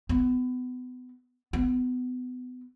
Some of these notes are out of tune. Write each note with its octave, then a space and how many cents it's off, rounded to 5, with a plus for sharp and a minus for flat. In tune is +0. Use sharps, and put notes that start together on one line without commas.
B3 +30
B3 +30